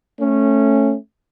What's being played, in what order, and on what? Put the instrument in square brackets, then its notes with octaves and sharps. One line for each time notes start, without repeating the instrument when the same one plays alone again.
[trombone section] A3 C#4